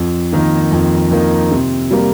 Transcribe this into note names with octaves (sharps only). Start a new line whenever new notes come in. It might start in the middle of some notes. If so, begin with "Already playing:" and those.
Already playing: F2
D#3 A#3 D#4
F2
D#3 A#3 D#4
C3
G3 A#3